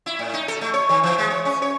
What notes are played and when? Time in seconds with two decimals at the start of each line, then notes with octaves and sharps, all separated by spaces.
0.06 E4
0.19 A2
0.34 D#4
0.48 A4
0.61 A3
0.74 C#5
0.89 D#3
1.03 E3
1.18 G#3
1.30 C#5
1.45 C#4
1.62 C#5